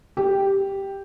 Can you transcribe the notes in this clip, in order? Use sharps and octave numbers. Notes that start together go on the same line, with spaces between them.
G4